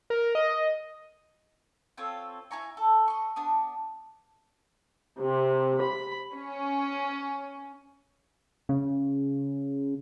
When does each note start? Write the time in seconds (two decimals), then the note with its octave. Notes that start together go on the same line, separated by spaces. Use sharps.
0.10 A#4
0.35 D#5
1.97 C4 F4 A4 C#5
2.51 E4 G#5 A#5 C#6
2.77 A4
3.08 D#5 C#6
3.36 B3 D4 D#6
5.21 C3
5.82 B5
6.34 C#4
8.69 C#3